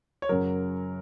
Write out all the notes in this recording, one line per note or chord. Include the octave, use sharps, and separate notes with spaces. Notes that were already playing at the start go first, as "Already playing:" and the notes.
C#5
F#2 C#3 F#3 A#4